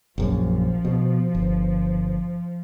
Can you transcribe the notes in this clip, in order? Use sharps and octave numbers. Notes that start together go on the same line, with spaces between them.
A#1 F#2 F3
B2
G1